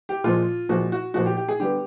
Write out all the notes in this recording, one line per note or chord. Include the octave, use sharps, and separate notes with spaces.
G4
A#2 F3 G#3 F4
A#2 F3 G#3 F#4
F#4
A#2 F3 G#3 F#4
G4
G4
G#4
D3 G3 B3 G4